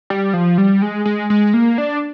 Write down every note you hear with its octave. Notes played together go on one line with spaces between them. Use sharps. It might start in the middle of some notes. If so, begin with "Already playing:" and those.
G3
F3
G3
G#3
G#3
G#3
A#3
D4